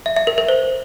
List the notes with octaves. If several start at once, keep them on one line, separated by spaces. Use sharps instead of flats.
E5
E5
A#4
A#4
C5